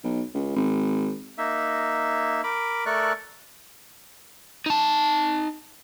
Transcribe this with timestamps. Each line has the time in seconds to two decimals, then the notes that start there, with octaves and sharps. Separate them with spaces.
0.04 B1
0.34 C#2
0.56 G#1
1.38 A#3 D#4 E5
2.44 A#4 B5 D6
2.86 A3 A4 A#4 D5 C#6 F#6
4.66 D#4 A5